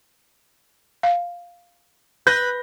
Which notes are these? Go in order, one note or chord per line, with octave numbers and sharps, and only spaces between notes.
F5
B4 G6 A#6